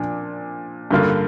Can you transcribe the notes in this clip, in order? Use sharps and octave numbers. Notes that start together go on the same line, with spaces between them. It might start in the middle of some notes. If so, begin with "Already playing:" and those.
Already playing: A#2 F3 D4
G2 D3 A#3 F4